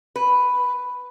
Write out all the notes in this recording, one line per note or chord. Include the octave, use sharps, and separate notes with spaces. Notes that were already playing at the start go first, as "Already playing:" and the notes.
B4